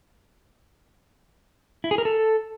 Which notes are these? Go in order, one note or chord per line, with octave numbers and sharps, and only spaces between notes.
E4
G#4
A#4
A4